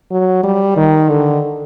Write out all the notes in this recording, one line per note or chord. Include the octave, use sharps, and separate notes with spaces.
F#3
G3
D#3
D3